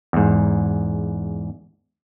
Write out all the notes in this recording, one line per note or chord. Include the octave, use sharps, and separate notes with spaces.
E2 G#2